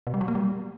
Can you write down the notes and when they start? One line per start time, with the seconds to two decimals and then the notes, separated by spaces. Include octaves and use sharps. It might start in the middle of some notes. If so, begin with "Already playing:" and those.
0.07 B2
0.14 G3
0.21 F#3
0.28 A#3
0.35 G3